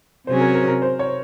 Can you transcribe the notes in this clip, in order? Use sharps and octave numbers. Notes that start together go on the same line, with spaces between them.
C3 F#3 C#4 G#4 C5
A#4
A#4
A#4
C5
C#5